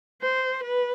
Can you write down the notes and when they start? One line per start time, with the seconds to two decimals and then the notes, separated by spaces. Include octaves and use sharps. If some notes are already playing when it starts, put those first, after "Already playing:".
0.22 C5
0.63 B4